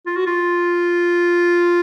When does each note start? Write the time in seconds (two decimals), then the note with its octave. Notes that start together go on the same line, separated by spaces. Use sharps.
0.06 F4
0.16 F#4
0.26 F4